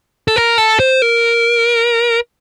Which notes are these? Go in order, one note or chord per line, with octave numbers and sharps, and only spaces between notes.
A4
A#4
A4
C5
A#4